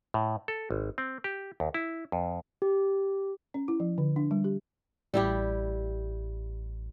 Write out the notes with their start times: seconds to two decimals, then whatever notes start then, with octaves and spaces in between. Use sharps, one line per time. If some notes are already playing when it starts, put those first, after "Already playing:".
0.14 A2
0.48 A4
0.71 G#1
0.98 C4
1.24 G4
1.60 D#2
1.74 E4
2.12 F2
2.62 G4
3.54 C#4
3.68 E4
3.80 F3
3.98 D3
4.16 D4
4.31 G3
4.44 G4
5.14 A1 G3 E4 G4